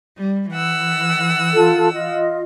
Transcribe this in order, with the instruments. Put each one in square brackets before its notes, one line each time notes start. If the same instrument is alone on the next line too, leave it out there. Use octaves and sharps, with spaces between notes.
[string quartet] G3
E3 F#5 E6
[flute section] F4 A4
F4 D#5